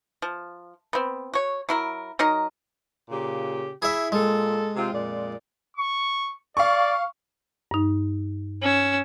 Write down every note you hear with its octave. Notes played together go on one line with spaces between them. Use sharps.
F3
B3 C4
F#4 C#5
F#3 E4 A#4
F#3 D#4 A#4 D#5
A#2 C#3 G4
E4 G#4 E5
A#2 G#3 A4
C3 C4 F4
F2 A#2 D5
C#6
D5 F5 C#6
G2 D#4
C#4 E6